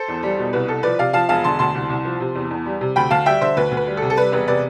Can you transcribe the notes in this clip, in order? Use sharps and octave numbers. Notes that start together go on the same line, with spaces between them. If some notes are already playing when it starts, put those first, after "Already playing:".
Already playing: A4 C5
E2
G3
B2
C2 B4
C2 A4
F3 B4 D5
C3 D5 F5
F3 F5 A5
E1 F5 A5
D3 A5 C6
D2 A5 C6
C2
C2
F3
C3
E2
E2
G3
C3
D2 G5 B5
D2 F5 A5
G3 E5 G5
D3 C5 E5
D2 B4
D2
B4
G3
A4
C3
A4
G3 B4
E1 B4
C3 B4 D5